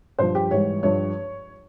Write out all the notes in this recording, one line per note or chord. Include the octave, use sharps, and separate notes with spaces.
G2 F3 C5
G4
G#2 E3 G3 C#5
G2 F3 C#5